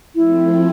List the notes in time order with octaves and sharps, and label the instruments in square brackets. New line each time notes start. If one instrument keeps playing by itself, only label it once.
[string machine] F3 A3 C4 [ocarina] E4